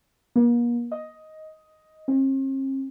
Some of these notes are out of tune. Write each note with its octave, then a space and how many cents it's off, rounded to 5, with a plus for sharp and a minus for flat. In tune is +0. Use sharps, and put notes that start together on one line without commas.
A#3 +40
D#5 +5
C4 +45